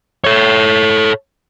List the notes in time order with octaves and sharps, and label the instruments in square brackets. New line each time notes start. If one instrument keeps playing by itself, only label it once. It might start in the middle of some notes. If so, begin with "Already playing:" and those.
[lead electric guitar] A4 C#5